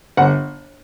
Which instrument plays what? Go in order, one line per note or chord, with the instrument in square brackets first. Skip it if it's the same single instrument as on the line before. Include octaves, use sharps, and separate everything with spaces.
[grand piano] G1 F#5